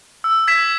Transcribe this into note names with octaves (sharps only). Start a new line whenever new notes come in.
E6
G#6 B6 E7